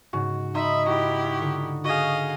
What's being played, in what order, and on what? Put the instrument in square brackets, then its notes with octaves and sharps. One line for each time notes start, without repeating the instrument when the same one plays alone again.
[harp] G#2 C#3 [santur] F#4
[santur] D#4 C6 D#6 [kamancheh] E5 B5
[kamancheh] E4 G4 [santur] F#4 B5 [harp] A#5
[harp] D3 F4 C#6
[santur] F#4 G#4 [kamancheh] D#5 F5